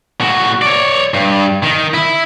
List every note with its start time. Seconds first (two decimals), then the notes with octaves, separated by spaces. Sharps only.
0.20 A2 F#4
0.62 C#5 D5
1.14 G2
1.63 D#3
1.94 E4